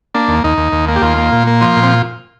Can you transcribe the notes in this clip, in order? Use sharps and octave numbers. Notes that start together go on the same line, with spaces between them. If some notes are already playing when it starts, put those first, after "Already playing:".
A#3 D4
D#2
D#2 D#4
D#2
D#2
A#3
G4
D#2 F4
A#3
A#2
A#3
F3 F4
A#2
C4